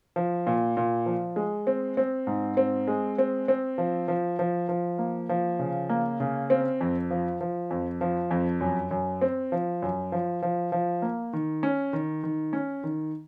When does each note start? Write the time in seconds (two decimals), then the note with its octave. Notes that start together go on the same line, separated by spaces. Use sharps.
0.16 F3
0.47 A#2
0.77 A#2
1.06 F3
1.36 G#3
1.67 C4
1.97 C4
2.27 G#2
2.57 C4
2.88 G#3
3.18 C4
3.48 C4
3.78 F3
4.08 F3
4.39 F3
4.69 F3
4.98 A#3
5.29 F3
5.59 C#3
5.89 A#3
6.20 C#3
6.50 C4
6.81 F2
7.11 F3
7.41 F3
7.70 F2
8.01 F3
8.31 F2
8.61 F#2
8.91 F#2
9.21 C4
9.52 F3
9.82 F#2
10.12 F3
10.42 F3
10.72 F3
11.02 A#3
11.33 D#3
11.63 C#4
11.93 D#3
12.24 D#3
12.53 C#4
12.84 D#3